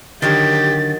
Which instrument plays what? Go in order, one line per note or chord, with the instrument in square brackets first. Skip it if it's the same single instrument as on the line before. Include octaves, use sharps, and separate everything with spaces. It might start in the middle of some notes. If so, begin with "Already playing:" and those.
[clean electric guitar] D3 [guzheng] D#3 F#3 C#5 [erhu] G4 [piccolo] A6